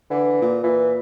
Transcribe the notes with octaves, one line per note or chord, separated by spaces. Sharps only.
D3 E3
A#2
A#2 E3